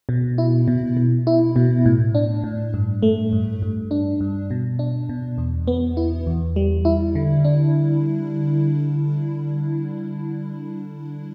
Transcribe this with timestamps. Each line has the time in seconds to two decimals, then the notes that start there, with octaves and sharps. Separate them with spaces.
0.09 B2
0.38 E4
0.68 B2
0.97 B2
1.27 E4
1.56 B2
1.86 A2
2.15 D4
2.44 A2
2.74 G2
3.02 A3
3.33 G2
3.62 G2
3.91 D4
4.21 G2
4.51 B2
4.79 D4
5.09 B2
5.38 E2
5.67 B3
5.97 E4
6.27 E2
6.56 G3
6.85 E4
7.15 D3
7.45 D4